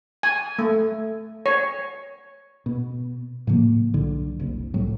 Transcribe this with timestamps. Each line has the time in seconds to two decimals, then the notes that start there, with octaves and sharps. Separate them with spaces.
0.23 G#5
0.59 A3
1.46 C#5
2.66 B2
3.47 A2 C#3 F3 A#3
3.94 B1 D3
4.40 F#1 C2
4.74 C2 A2 F#3